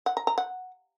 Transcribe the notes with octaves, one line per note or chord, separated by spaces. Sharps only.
F#5
A#5
A#5
F#5